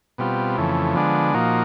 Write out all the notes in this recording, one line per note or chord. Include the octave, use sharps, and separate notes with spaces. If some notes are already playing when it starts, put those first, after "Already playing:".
B2 G3 C4 F4
F2 C#3 E3 A3
D3 F3 G#3 B3 D4
A#2 F3 A#3 D#4 F#4